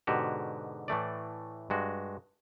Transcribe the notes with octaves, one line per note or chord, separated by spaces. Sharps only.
G#2 B2 D3 F#4 G4
A2 E3 A3 D5
G2 G#3 F#4